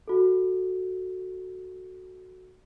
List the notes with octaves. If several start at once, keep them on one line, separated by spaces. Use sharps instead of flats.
F#4 A4